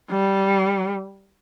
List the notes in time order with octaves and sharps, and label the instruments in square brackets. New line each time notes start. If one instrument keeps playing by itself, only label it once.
[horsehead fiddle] G3